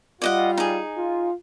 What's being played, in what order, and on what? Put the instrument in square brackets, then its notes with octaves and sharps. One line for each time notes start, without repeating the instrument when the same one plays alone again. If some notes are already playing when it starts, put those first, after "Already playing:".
[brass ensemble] G3 F4 [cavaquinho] D5 D#5 F#5
[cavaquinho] D#4 G#4
[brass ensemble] F4